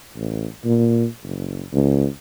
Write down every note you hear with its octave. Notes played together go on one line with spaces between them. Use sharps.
A1
A#2
F#1
C#2